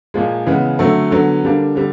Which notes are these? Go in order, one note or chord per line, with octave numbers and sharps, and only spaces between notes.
A#2 F3 G#3
C#3 E3 G#3 B3
D3 F#3 A3 C4
D3 F#3 B3
D3 G3 A#3 D4
D3 G3 C4